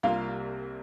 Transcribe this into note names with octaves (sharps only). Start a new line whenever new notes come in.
C2 C3 G3 A#3 F4 F5